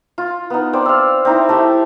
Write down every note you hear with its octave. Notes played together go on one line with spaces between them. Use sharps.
F4
B3 D#4
C4 C5 D5
F5 E6
C4 D#4 E4
A3 E4 G4